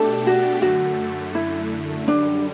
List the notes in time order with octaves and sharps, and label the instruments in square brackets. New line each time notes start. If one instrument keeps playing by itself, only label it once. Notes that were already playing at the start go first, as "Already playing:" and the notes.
Already playing: [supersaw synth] B2 A3 D4 G4 [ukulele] A4
[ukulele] F#4
[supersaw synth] F#2 D3 A3 [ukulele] F#4
[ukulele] E4
[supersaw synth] F#2 D3 G3 [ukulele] D4